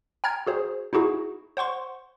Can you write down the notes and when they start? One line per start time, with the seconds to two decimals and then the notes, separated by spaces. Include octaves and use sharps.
0.24 G5 A#5 F6 G#6
0.47 F#4 G#4 C5
0.93 D#4 E4 F#4 G#4
1.57 C5 F#5 C6 C#6